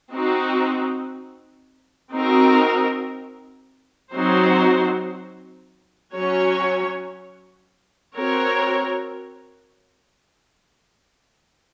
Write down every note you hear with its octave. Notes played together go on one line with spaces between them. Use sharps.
C4 D#4 F#4
C4 D#4 F#4 A#4
F#3 C4 D#4 F#4 C5
F#3 C#4 F#4 C#5
C4 F#4 A#4 C#5